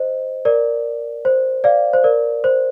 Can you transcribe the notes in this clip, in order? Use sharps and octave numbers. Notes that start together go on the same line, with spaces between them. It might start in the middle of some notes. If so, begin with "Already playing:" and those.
Already playing: C5 D#5
A#4 D5
C5
D5 F5
C5
A#4 D5
C5